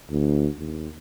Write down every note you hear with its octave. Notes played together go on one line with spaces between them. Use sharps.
D2
D#2